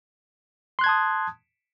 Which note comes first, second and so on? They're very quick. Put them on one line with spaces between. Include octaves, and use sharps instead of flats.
C6 F#6 G#6 A5 D#6